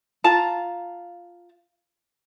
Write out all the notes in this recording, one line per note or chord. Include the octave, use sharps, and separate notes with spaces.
F4 A5 A#5